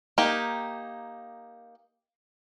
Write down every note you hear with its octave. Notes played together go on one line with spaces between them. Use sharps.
A#3 D#4 G4